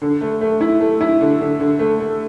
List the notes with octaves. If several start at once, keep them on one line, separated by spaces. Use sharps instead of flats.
D3
A3
A3
E4
A3
E4
D3
D3
D3
A3
A3